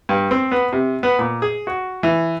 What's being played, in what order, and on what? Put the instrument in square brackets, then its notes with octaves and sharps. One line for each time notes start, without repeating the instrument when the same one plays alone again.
[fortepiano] G2
C4
B3
C3
B3
A#2
G#4
F#4
E3